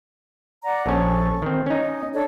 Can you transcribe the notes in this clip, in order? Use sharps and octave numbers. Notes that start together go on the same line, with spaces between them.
D5 F#5 A#5
A#1 C#4 A4 C#6
D#3 C4
C#4 D#4 D#5
D4 A4 C#5